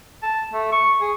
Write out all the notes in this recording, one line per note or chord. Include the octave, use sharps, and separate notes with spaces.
A5
A3
C#6
G#4